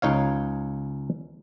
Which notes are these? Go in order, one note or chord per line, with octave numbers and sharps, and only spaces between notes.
C#2 D#4 C#5 F5